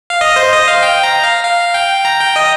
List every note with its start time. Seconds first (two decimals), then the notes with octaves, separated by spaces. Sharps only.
0.10 F5
0.21 D#5
0.36 C5
0.53 D#5
0.68 F5
0.83 G5
1.03 A#5
1.24 F5
1.44 F5
1.74 G5
2.05 A#5
2.20 G5
2.36 D#5